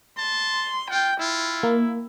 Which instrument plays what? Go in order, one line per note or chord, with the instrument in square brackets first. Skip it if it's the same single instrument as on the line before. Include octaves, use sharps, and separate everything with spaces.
[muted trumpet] A5 [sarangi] C6
[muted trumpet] F4 [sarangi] G5
[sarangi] E4 [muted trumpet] F4
[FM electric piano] A#3